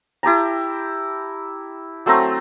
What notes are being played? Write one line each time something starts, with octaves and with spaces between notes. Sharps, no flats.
E4 G4 A5 A#5
F#3 A3 C4 A#5